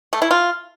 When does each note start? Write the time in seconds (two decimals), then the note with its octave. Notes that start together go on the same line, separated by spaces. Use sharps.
0.13 A3
0.22 E4
0.31 F4